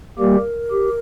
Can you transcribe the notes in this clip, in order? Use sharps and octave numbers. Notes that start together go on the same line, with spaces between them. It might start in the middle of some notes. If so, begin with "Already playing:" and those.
G3 A#3 G4 A#4
G4